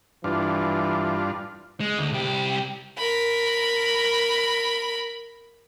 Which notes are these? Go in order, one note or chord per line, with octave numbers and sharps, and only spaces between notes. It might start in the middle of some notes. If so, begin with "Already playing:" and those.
G2 E3 D4 F4
G#3
D2
C2 G4
A#4 B5